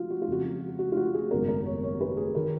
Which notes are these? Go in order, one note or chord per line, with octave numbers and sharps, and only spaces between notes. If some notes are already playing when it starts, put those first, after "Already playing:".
Already playing: F3 G#3 F4 F#4
F#4
F4
F2 C#3 G#3 F#4
F#4
F4
F#4
G#4
G#1 F#2 C#3 F#3 B3 A#4
A#4
C#5
C#5
B4
G#4
D#3 A#4